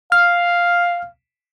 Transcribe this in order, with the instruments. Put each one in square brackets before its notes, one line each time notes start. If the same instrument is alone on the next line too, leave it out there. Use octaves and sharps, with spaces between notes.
[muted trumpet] F5 [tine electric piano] F6